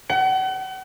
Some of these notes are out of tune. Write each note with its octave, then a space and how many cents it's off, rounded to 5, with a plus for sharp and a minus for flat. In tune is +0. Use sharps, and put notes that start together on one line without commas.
F#5 +40